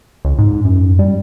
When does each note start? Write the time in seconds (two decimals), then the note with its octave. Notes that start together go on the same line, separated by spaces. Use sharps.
0.25 C#2
0.39 G#2
0.65 F#2
0.99 G3